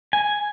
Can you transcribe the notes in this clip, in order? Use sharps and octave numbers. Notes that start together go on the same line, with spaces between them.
G#5